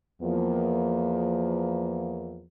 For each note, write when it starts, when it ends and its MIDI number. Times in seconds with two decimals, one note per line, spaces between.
0.21 2.44 40
0.21 2.44 53
0.21 2.44 58